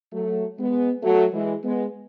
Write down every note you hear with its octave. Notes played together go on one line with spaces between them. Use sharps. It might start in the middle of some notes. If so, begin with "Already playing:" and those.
F#3 A3
G#3 B3
F#3 A3
E3 G#3
G#3 B3